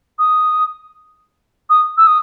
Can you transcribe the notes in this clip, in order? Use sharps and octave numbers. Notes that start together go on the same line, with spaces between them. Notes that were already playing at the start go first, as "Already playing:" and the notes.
D#6
D#6
E6
D#6